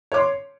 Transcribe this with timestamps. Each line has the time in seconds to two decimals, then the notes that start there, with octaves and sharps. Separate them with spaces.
0.12 C#5
0.14 D6
0.17 C6